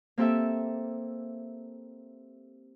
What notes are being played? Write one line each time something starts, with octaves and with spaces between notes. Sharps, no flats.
A#3 C4 G4 A4 E5